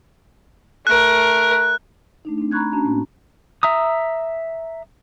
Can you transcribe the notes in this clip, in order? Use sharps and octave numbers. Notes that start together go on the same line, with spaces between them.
A3 A#4 F#6
A3 D4 D#4
A3 C4 D4
A#5 B5 C#6 F#6 G#6
C#4 D4 F#4 A5 A#5
A2 A#3 C4 F#4
E5 A#5 D#6